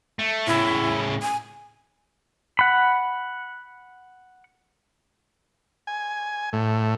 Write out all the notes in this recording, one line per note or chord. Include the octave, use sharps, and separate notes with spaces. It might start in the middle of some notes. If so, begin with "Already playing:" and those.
A3
A2 C#3 E4
G#5
F#5 B5
G#5
A2